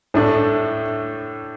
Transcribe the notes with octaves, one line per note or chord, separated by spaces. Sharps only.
A2 A3 D4